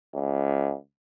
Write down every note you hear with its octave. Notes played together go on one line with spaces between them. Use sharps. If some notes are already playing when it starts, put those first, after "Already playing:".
C#2